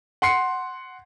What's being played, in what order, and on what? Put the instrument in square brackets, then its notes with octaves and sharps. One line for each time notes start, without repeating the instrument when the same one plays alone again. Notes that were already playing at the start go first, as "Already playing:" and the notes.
[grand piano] F#5 C6 C7 C#7